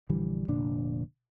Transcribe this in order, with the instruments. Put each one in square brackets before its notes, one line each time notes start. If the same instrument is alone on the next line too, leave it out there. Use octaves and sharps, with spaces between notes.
[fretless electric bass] A#1 D3 E3 G3
F1 A#2 D3 D4